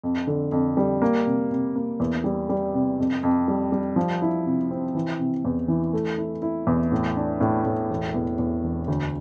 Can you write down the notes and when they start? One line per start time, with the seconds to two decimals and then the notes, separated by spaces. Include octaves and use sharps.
0.04 F2
0.27 D3
0.52 F2
0.77 G3
1.02 A#3
1.26 C3
1.51 C3
1.76 A#3
2.00 E2
2.24 G3
2.49 G3
2.74 C3
2.99 F2
3.23 F2
3.48 G3
3.72 G3
3.96 F3
4.22 E4
4.46 C3
4.71 C4
4.95 E3
5.19 C3
5.45 E2
5.68 E3
5.93 A3
6.18 E4
6.42 E4
6.67 E2
6.91 A2
7.16 D4
7.40 A2
7.65 A2
7.90 E1
8.14 E2
8.39 E2
8.64 E1
8.88 D2